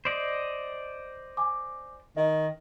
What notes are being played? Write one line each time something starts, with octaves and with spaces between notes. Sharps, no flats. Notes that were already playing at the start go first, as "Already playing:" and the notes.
C5 D5 D#5
G#5 D6
D#3 D#5